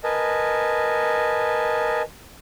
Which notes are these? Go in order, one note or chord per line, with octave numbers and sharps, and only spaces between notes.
A#4 B4 D#5 G#5 A5